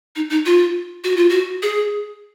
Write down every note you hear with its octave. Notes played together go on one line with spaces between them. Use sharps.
D#4
D#4
F4
F#4
F4
F#4
G#4